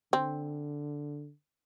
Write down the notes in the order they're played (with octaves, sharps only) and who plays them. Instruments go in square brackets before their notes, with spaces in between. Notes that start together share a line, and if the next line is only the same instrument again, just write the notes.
[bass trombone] D3 [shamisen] C4